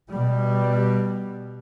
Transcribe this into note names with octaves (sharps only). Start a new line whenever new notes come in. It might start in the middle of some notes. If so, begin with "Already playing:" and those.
B2 G3